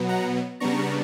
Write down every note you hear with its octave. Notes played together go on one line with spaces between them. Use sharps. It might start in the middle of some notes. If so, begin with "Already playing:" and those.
Already playing: B2 F#3 B3
F#5 A#5
C#3 G3 B3 D4 A#5 C#6